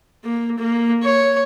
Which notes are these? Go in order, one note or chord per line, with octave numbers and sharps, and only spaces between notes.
A#3
A#3
C#5